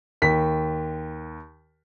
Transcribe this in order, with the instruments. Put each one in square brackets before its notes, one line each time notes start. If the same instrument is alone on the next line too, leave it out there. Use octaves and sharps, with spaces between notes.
[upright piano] D#2 B6